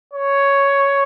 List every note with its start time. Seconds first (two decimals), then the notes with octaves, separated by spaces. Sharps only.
0.14 C#5